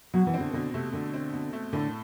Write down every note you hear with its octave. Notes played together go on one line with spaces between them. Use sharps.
B2 F#3
E3
C4
D3
B2 D3
C3 A3
B2 D3
C4
B2
A3
A2 D3